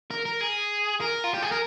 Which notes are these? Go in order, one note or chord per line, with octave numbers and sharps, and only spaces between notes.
A#4
A#4
G#4
A#4
F4
G4
G#4
A#4